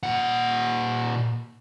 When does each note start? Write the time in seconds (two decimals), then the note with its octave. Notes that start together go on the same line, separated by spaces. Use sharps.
0.03 A#2 F#5